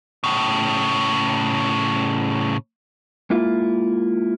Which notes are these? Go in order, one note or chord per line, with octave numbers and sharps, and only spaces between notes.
A2 C#3
G#3 A#3 E4 F4